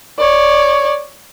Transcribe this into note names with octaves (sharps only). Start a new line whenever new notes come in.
C#5 D5